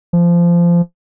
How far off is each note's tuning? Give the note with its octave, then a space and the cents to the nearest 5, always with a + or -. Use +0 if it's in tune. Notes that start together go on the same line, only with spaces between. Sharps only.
F3 -20